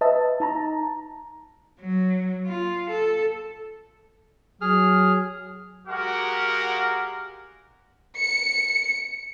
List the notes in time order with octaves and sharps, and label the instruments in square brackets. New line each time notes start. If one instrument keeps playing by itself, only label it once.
[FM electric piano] B4 D#5 E5 A5
D#4 A5 A#5
[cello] F#3
F4
A4
[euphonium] F#3 [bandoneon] G#4 F6
[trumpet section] G#3 F#4 G4 A#4 F5 F#5
[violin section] C#7